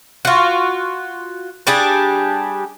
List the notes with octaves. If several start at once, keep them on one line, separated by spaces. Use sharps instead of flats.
F4 F#4
G3 D4 G4 G#4